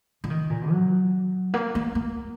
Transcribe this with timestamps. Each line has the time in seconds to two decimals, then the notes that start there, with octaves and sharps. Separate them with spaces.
0.24 F3
0.30 D#3
0.50 A#2
0.71 F#3
1.54 A#3
1.75 A#3
1.95 A#3